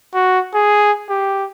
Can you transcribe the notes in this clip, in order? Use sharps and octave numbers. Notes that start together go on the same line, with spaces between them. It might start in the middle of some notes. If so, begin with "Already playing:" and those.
F#4
G#4
G4